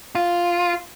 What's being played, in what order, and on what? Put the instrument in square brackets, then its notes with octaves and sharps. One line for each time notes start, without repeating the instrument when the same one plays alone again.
[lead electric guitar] F4